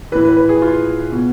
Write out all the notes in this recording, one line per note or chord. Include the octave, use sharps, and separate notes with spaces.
A2 E3 B4
B4
B4
G#4
F4
B2